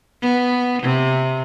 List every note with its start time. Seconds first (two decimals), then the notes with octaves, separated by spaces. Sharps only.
0.22 B3
0.82 C3